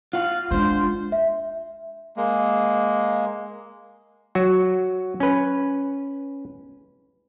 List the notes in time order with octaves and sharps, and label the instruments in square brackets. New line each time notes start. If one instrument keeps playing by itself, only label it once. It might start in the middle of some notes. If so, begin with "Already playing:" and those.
[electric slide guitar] F4 F#5 [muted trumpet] F5
[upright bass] G#3 [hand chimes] D4 C6 [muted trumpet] C5
[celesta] E5
[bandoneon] G#3 A#3
[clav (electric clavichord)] F#3 F#4
C#4 B4